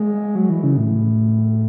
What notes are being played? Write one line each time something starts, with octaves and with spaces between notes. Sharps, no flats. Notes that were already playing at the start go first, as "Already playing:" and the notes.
Already playing: G#3
F#3
E3
C#3
A2